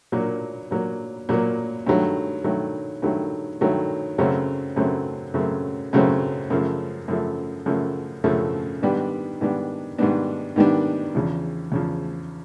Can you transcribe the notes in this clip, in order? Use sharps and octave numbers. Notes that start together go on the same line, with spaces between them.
A#2 F#3 A#3
A#2 F#3 A#3
A#2 F#3 A#3
G2 D#3 F#3 A3
G2 D#3 F#3 A3
G2 D#3 F#3 A3
G2 D#3 F#3 A3
F#2 C#3 F#3 A3 C4
F#2 C#3 F#3 A3 C4
F#2 C#3 F#3 A3 C4
F#2 C#3 F#3 A3 C4
F#2 C#3 F3 A3
F#2 C#3 F3 A3
F#2 C#3 F3 A3
F#2 C#3 F3 A3
G#2 D#3 G3 B3 D4
G#2 D#3 G3 B3 D4
G#2 D#3 G3 B3 D4
G#2 D#3 G3 B3 D4
E2 C#3 F3
E2 C#3 F3